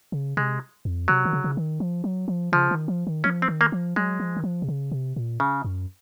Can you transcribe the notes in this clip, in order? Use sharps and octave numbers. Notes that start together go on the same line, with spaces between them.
C#3
C3 G#3
F2
C3 F#3
D#3
C#3
C#3
D#3
F3
F#3
F3
C#3 F3
D#3
F3
D#3
F3 C#4
C4
D#3
A#3
F3
F#3 G#3
F3
D#3
F3
C3
C#3
C3
A#2
C#3
F#2